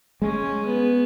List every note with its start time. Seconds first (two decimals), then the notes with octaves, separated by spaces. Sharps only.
0.22 G#3 C#4
0.65 B3